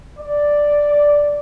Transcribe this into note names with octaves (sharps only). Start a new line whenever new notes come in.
D5